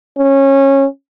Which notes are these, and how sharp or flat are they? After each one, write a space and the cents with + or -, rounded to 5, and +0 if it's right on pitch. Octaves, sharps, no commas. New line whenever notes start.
C#4 -20